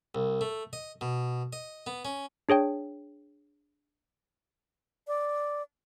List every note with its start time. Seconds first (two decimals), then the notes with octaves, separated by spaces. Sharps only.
0.15 C2
0.41 A3
0.73 D#5
1.01 B2
1.53 D#5
1.87 B3
2.05 C#4
2.49 D4 G#4 C#5 G5
5.07 D5